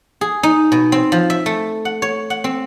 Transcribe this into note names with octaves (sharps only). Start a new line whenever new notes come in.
G#4
D#4
B2
C4
F3
E5
A3
F#5
C#5
F#5
C4